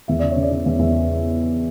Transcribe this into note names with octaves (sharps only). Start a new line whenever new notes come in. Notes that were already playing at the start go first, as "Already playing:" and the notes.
E2 E5
C#3 D5
C#5
C#3
D5
C#3
E2 E5
E2 E5